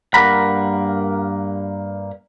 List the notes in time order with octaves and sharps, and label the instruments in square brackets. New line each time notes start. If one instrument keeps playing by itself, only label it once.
[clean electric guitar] G2 A#3 A#4 F#5 A#5 B5